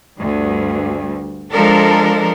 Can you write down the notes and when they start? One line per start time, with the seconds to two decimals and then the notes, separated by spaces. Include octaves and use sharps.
0.17 D2 G2
1.51 F3 G#3 D4 A4 A#4